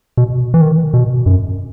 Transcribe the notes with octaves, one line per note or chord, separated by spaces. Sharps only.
B2
E3
D#3
B2
F#2